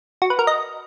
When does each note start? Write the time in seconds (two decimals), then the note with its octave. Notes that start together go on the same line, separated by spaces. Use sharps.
0.22 F#4
0.30 B4
0.39 A#4
0.47 D#5